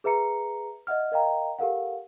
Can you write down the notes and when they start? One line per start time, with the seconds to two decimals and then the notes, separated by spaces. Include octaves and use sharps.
0.04 G#4 B4 E5 A#5 C#7
0.87 D#5 E5 F#5 F6
1.12 A#4 D#5 F5 G5 A#5
1.59 G4 A4 A#4 F5 F#5